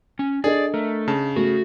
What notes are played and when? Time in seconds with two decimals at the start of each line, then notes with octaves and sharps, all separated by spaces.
0.19 C#4
0.44 D4 G#4 A4 D5 D#5
0.74 A3 A#4
1.08 C#3 A5
1.36 A3 F#4